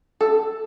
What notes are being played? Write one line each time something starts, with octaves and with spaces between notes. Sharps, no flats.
A4